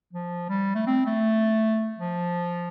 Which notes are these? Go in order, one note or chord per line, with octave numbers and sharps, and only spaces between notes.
F3
G3
A3
C4
A3
F3